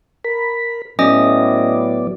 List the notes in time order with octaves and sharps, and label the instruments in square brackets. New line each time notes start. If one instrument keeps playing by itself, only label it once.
[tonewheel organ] A#4 B5
[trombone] A2 [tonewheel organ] F#3 B3 D5 [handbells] C#4 D#5 D#6